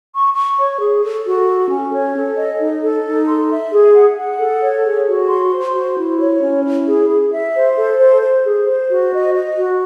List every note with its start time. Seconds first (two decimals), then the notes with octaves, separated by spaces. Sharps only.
0.14 C#6
0.35 C#6
0.58 C#5
0.80 G#4
1.03 A4
1.26 F#4
1.48 A4
1.70 C#4
1.93 C#5
2.15 A4
2.37 D#5
2.60 D#4
2.83 A4
3.04 D#4
3.28 C6
3.50 E5
3.72 G#4
3.94 F#5
4.18 F#5
4.39 A4
4.62 C#5
4.85 G#4
5.08 F#4
5.29 C6
5.51 C5
5.74 F#4
5.97 E4
6.19 C#5
6.42 C#4
6.65 E4
6.87 G#4
7.09 G#4
7.32 E5
7.55 C5
7.77 A4
7.99 C5
8.22 C5
8.44 G#4
8.66 C5
8.90 F#4
9.12 D#5
9.34 D#5
9.57 F#4